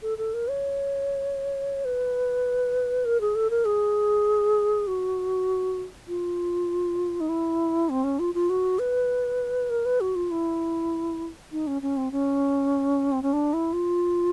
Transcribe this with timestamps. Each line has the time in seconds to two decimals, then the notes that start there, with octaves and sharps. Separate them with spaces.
0.02 A4
0.18 A4
0.34 A#4
0.48 C#5
1.85 B4
3.05 A#4
3.21 G#4
3.35 A4
3.50 A#4
3.65 G#4
4.87 F#4
6.08 F4
7.21 D#4
7.29 E4
7.90 C4
8.04 C#4
8.19 F4
8.34 F4
8.50 F#4
8.79 B4
9.70 A#4
9.85 B4
10.01 F#4
10.15 F4
10.31 E4
11.52 D#4
11.67 C#4
11.82 C#4
11.97 C4
12.12 C#4
13.12 C4
13.23 C#4
13.33 D4
13.53 E4
13.73 F4